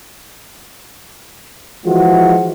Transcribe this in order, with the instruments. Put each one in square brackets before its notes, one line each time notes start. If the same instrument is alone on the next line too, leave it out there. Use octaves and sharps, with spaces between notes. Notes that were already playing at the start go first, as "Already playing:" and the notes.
[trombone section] E3 F3 G#3 F4 F#4